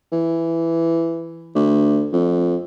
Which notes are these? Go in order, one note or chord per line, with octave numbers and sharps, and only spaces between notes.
E3
D2
F2